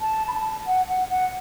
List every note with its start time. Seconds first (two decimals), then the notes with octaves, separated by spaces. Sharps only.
0.01 A5
0.28 B5
0.34 A5
0.67 F#5
0.88 F#5
1.10 F#5